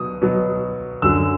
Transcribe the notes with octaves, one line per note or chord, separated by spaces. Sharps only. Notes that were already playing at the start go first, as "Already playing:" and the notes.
Already playing: B2 F#3 D#6
B2 F#3
F#2 D3 F#3 E6